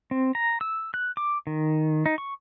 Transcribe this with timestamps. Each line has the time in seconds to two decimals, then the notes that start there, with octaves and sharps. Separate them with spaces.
0.11 C4
0.35 A#5
0.61 E6
0.94 F#6
1.17 D6
1.47 D#3
2.06 D#4
2.18 C#6